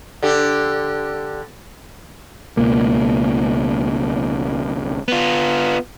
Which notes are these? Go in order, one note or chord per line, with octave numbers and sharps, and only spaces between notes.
D3 G4
C#2 B2 A#3
B3 F4